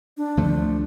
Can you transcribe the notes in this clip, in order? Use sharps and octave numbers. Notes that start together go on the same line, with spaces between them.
D4
D2 F3 A3